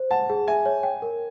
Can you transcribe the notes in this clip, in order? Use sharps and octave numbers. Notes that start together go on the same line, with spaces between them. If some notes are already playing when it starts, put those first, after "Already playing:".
Already playing: C5
F#5 A5
G#4
E5 G#5
C#5
G5
A#4